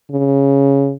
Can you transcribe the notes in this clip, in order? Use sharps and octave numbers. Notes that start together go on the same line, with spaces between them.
C#3